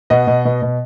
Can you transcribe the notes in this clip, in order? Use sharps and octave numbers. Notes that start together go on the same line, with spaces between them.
B2 D#5 F#5
B2
B2
B2